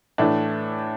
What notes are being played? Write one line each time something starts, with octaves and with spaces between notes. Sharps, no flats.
A2 E3 A3 D4